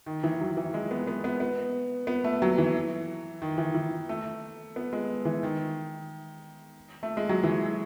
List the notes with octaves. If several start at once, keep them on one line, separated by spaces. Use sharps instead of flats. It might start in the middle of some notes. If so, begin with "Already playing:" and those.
D#3
E3
F#3
E3
G#3
B3
B3
B3
B3
B3
A3
F#3
E3
D#3
E3
E3
A3
B3
G#3
E3
D#3
A3
G#3
F#3
E3